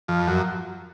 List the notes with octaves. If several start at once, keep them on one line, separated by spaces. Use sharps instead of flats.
F2
F#2